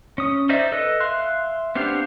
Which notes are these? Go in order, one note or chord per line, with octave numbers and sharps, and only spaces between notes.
C#4 D#6
D#4 C5 D5 E5
A4 B4 D#5
E5 F5 C6 F#6
B3 C4 D4 G4 F5